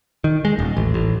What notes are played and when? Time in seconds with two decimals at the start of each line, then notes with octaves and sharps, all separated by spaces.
0.24 D#3
0.45 G#3
0.59 D#1
0.77 A1
0.94 A1